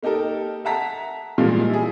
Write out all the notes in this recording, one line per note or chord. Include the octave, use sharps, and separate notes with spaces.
A#3 D#4 G4 A4 A#4
E5 F#5 A5 A#5 B6
A#2 E3 F3 G3 G#3 F5
E4 G#4